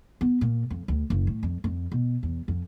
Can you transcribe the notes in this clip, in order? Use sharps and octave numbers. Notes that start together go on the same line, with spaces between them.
B3
A#2
F2
D2
F#1
A2
F2
F2
B2
E2
F2